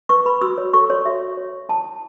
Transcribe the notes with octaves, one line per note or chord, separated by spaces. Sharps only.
B4 C#6
B4 B5
F#4 E6
C#5
A4 C#6
F#4 C#5
F#4 E5
F#4
C#5
C#5
E4 A5
E4